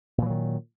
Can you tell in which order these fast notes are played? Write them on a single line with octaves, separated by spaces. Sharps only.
A#2 E3 F#3 D#3